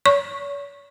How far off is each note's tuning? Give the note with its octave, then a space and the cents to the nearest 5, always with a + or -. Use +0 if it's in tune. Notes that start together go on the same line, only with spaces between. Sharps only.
C#5 +40 C#6 -15